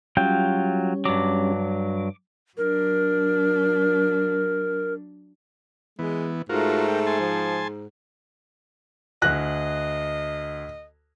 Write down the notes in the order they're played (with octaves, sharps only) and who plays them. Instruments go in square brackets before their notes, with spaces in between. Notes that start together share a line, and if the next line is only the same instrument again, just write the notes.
[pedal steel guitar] F#3 F4 G5 [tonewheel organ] G3 C#4
[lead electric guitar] G2 F#3 [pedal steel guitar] D6
[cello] F#3 D4 [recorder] A#4
[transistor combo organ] E3 B3 [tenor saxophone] G#3
[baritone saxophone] G#2 [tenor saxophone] A3 [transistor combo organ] F4 F#4 A#4
[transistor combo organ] A#4 G5
G#5 A5 C6
[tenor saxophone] F3
[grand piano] D2 G#5 A#6 [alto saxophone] D#5 [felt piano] F#6